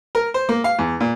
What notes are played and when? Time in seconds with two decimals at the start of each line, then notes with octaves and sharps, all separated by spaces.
0.15 A#4
0.34 C5
0.49 A#3
0.64 F5
0.79 E2
1.00 A#2